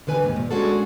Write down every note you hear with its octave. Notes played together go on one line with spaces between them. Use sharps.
D3 D#3 B4 G#5
D#2 G#2 C3
A#2
G#3 C#4 D4 F#4 G#4 A4